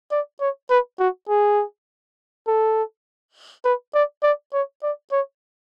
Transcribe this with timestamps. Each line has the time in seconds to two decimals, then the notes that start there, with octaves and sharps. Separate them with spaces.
0.12 D5
0.41 C#5
0.70 B4
1.00 F#4
1.29 G#4
2.47 A4
3.65 B4
3.94 D5
4.23 D5
4.53 C#5
4.83 D5
5.12 C#5